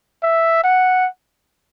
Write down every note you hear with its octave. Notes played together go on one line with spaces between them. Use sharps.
E5
F#5